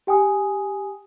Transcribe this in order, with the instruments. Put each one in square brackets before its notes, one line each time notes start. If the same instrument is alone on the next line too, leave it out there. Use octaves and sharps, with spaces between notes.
[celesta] G4 G5 G#5 D#6